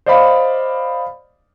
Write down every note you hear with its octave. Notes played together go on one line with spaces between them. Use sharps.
C5 D5 D#5 F5 B5